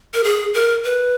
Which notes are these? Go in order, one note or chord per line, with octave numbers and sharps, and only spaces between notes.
A#4
G#4
A#4
B4